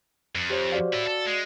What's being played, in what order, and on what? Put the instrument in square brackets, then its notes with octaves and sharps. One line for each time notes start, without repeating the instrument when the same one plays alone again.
[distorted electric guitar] F2
[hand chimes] G4 C5 C#5
F#4 D5 F5
[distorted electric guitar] E4 A4
A4
G#3